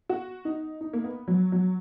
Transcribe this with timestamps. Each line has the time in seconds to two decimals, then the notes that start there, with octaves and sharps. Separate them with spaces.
0.09 F#4
0.45 D#4
0.81 D#4
0.93 A#3
1.04 B3
1.28 F#3
1.52 F#3